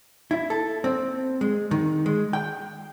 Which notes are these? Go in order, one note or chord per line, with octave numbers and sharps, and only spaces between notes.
E4
A4
C4
G#3
D#3
G#3
G5